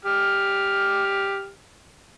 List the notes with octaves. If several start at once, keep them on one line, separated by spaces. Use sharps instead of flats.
G4 F6